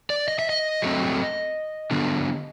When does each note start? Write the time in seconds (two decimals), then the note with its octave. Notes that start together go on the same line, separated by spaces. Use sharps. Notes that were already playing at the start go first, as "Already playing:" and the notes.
0.10 D5
0.28 D#5
0.39 E5
0.49 D#5
0.82 F#3 A3 C4
1.91 D3 F#3 B3 D4